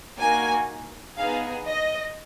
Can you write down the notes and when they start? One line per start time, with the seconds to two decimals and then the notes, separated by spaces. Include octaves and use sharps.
0.18 A#3 D#4 F#4 G#5
1.17 B3 D#4 G#4 F5
1.66 D#5